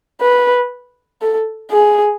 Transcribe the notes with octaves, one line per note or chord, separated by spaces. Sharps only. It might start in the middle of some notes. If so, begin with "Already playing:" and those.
B4
A4
G#4